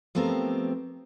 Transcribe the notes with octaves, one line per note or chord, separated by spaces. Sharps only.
F3 A3 B3 C4 G4 A#4